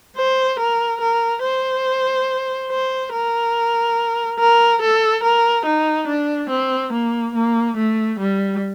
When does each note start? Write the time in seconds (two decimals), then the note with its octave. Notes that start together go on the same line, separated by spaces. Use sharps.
0.17 C5
0.59 A#4
1.01 A#4
1.43 C5
2.70 C5
3.13 A#4
4.40 A#4
4.82 A4
5.23 A#4
5.66 D#4
6.07 D4
6.50 C4
6.93 A#3
7.35 A#3
7.77 A3
8.20 G3